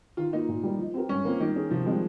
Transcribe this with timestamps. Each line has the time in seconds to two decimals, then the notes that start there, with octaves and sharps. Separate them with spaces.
0.17 D#3 F4
0.33 A#3 D#4 F4
0.48 A#2
0.63 G3 A#3
0.78 F3
0.94 C4 G4 A#4
1.09 G2 C#4
1.25 F3 A#3 C4 F4 A#4
1.40 D#3 G3
1.56 C#4 G#4
1.71 C3 F3
1.86 G3 G#3 C4 F4